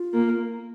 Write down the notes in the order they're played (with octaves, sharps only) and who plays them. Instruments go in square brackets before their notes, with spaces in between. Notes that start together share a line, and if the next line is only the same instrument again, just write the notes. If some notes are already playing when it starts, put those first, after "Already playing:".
Already playing: [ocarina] F4
[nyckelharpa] A#3